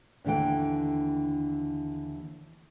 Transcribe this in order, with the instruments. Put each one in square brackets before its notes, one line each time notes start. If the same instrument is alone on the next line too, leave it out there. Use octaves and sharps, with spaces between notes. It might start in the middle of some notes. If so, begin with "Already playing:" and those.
[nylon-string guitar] D#2 D3 E3 A3 G5